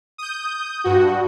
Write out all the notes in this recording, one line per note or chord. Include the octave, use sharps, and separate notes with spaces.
D#6 G6
G2 F#4